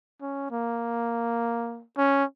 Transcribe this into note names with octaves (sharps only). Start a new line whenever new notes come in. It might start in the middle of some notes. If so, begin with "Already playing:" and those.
C#4
A#3
C#4